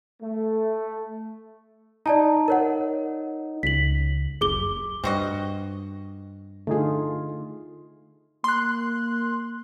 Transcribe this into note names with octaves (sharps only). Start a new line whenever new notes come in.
A3
D#4 D5 A5 A#5
A#4 C#5 F#5
C#2 B6 F#7
F#1 G#4 D6 G7
G2 C4 F#4 D#5
D3 A3 D#4 F4 G#4
A#3 C6 F#6